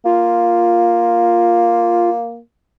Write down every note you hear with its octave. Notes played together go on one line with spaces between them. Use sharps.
A#3 F4